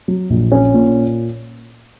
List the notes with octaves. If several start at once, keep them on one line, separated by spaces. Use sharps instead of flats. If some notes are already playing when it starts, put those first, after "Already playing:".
F#3
A#1
C#4
A#2